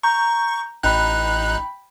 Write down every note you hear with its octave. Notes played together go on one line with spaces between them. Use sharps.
A#5 C#6 G6
A1 D#4 G5 B5 F#6